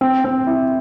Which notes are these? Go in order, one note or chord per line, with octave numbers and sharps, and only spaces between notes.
C4
C4
E4